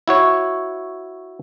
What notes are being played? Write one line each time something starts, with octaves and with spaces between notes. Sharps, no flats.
E4 F#4 C#5